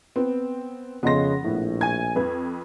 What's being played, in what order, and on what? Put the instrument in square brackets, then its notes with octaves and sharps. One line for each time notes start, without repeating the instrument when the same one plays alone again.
[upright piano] B3 [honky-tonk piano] C4
[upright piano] F2 D#5 C6 [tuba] C#3 [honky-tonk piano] B3 A#6
[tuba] A#1 [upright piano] A2
[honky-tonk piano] G#5 G#6
[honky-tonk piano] F2 [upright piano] B4